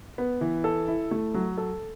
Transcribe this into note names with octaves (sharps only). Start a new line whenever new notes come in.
B3
E3
A4
E4
A3
F#3
A4